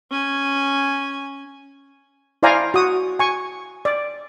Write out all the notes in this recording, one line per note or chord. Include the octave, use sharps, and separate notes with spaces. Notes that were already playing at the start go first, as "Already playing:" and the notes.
C#4 G#5
E4 C5 D5 F5 G#5 A#5
F#4 D#6
G#5 C#6
D5